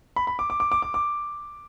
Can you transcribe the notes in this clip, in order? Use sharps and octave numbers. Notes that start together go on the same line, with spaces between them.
B5
B5
D6
D6
D6
D6
D6
D6